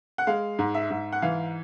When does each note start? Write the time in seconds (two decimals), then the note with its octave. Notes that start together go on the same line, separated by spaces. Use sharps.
0.18 F#5
0.27 G#3 F5
0.59 G#2
0.74 E5
0.90 G#2
1.12 F#5
1.22 E3 F5